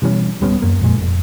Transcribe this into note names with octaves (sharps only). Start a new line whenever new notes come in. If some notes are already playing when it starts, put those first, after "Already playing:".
B2 E3 G3 C#4
D1 G3 B3 C#4
F#2 A#3
F2 A#2 G#3
F1